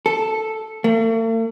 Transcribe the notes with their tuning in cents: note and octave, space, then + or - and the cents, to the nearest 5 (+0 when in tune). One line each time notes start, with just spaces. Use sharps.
A4 +0
A3 +45